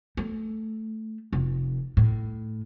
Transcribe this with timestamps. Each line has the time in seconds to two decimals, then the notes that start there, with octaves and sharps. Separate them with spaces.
0.17 A3
1.33 F1
1.97 A2